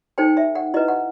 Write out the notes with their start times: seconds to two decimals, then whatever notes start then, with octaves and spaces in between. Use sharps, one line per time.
0.18 D#4 A4 C5 G5
0.37 E5
0.55 F#5
0.74 E4 B4 D#5
0.88 F#5